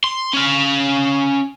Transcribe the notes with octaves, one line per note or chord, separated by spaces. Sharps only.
C6
C#4 F5